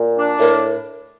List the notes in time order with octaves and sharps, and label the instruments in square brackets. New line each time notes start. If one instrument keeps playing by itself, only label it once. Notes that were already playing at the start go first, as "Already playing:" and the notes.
Already playing: [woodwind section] A#2
D4
[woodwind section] A2 [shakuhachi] A#4